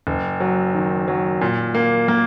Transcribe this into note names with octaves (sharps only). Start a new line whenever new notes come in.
F#1
F#3
D#3
F#3
A#2
A#3
A#3